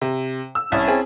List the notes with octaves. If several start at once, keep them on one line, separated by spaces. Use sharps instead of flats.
C3
E6
C2 C#4 E4 A5
C4 G#4